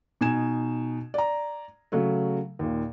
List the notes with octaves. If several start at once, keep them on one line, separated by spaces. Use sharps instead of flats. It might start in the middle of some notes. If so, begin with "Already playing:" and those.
B2 D#4 G#5 G#6 E7
D5 A#5
C#3 F#3 A3
D#2 A#2